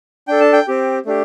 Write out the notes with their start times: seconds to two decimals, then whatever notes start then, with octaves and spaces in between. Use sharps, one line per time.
0.28 D4 A4 G5
0.40 A5
0.53 G5
0.68 C4 G4
1.06 A3 D4 G4